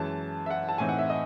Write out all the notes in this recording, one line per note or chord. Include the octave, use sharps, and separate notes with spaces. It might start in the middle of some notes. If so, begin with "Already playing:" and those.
Already playing: F#2 E3 G#3 A5
E5
F#5
A5
A2 E3 C4 D#4 G#5
F#5
E5
D#5